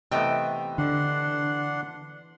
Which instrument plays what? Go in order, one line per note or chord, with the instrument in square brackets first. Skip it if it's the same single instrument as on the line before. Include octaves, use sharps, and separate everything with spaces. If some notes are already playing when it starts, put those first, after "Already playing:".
[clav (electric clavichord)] C3 A3 B3 [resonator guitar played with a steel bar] E3 D#5 G5
[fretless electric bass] D3 [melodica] D4 F#5 C6